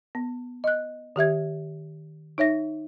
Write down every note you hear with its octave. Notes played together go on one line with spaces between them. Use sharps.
B3
D#5 F#6
D#3 G4 E5 G#6
D#4 C#5 E5 A#6